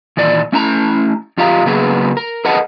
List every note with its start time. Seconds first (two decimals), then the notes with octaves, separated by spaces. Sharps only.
0.17 D#2 A#2 E3 D5
0.52 A3 C#4 E4 A5 A#5
1.37 F2 F4 G4 F5 A#5
1.66 C#3 F#3 A#3 B3 G#4 B4
2.17 A#4
2.45 G#4 A#4 B4 D#5 F#5 A5